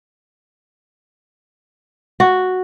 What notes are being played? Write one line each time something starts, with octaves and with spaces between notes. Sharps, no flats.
F#4